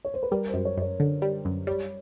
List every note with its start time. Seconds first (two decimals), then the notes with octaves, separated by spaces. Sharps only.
0.05 C#5
0.14 C5
0.23 B4
0.31 G3 A#4
0.48 C5
0.54 F#2
0.65 C#5
0.77 F#2 C#5
1.00 D3
1.22 G3
1.45 F#2
1.67 G3 C#5